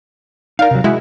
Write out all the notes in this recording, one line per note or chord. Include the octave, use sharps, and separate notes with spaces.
D#4 A#4 D5 F5
C3 F#3
G#3 E4 F#4